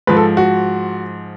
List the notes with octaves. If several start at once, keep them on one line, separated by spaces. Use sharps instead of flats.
G#2 F3 B4
A4
F#4